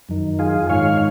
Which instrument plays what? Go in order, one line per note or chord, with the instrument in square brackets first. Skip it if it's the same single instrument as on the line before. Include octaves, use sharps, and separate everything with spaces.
[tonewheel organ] F#2 D#3
F4 G#4
G#2 D#3 C#5 F5